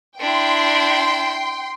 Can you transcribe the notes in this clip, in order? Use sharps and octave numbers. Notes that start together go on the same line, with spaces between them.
D4 E4 G5 C6